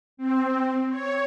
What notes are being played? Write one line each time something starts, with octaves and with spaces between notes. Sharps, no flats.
C4
C#5